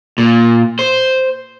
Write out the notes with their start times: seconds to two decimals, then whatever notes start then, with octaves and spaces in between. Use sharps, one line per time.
0.18 A#2
0.79 C5